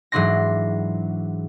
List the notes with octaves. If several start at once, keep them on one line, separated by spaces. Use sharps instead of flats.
G#2 E3 F#3 D4 C6 A#6